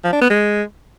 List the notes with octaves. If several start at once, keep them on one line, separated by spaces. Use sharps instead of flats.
F3
D4
B3
G#3